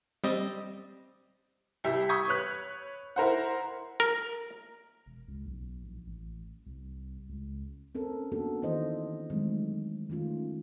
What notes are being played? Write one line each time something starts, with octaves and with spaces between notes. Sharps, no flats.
G3 C4 D#5
C2 G3 G4 E5 B6
C#6 D#6 E6 G6 G#6 B6
B4 C#5 F#6
E4 A#4 C5 F#5
A#4
E1
C#2
B1
A#1
A1
C2
C#2
C4 C#4 A4 A#4
A#3 B3 D4 F#4 A4
D#3 E3 E4 C5 D#5
D#3 E3 F#3 G#3 A3 C4
D#3 A3 C#4 F4